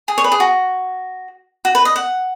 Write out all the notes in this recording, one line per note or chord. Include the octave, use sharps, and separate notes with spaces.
G#4
C#5
B4
G#4
F#4
F#4
B4
D#5
F#5